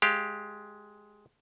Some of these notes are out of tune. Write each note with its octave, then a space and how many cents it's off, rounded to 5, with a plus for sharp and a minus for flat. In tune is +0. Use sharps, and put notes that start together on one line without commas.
G#3 +10 G4 +0 F5 +0